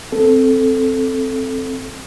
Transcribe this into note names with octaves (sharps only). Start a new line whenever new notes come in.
C4 A4